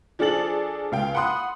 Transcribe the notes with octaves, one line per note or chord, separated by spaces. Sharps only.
F3 D4 G#4 A4 A6 F#7
C#2 F5 G5
F#5 B5 C6 D#6 F#6